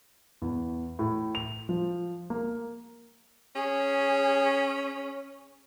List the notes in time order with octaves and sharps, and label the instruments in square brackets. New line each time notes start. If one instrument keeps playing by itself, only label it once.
[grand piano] E2
A2
F7
F3
A#3
[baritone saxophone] C#4 [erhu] G#4